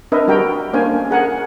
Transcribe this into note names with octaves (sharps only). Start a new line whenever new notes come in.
C4 D4 A#4 B4 D#5 E5
G3 F#4 A#4 G5 A#5
A#3 C#4 D4 C5 F5 G#5
G#4 A#4 F#5 G#5 A#5